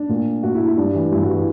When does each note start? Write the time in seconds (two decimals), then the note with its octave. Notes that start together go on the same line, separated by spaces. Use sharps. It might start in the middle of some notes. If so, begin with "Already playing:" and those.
Already playing: D4
0.09 A#2
0.43 A#2 F#4
0.55 E4
0.67 E4
0.77 G2 D4
0.95 E3
1.12 G2 E4
1.22 F#4
1.29 E3
1.34 F#4